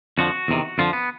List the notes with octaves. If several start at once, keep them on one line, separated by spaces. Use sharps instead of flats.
F2 D3 F3 F#4
E2 C3 D#3
F2 D3 F3 F4
B3